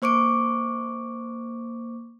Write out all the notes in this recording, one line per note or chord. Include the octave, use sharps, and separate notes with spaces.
A#3 C5 C#6 D6 D7